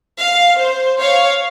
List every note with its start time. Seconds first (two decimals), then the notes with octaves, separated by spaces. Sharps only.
0.19 F5
0.59 C5
1.01 C#5 F5